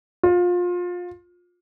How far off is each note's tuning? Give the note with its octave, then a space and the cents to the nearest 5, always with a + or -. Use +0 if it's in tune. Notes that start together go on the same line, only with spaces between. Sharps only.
F4 +25